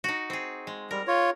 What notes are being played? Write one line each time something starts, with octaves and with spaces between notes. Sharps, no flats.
D#4 F#4
C4 G#4
G#3
G3 A#4
F4 C#5